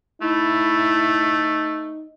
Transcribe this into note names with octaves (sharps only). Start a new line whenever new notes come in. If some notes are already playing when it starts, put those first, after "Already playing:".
A3 D#4 E4